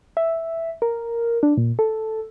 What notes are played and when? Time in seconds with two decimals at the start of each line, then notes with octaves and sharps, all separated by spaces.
0.17 E5
0.82 A#4
1.43 D4
1.57 A#2
1.79 A4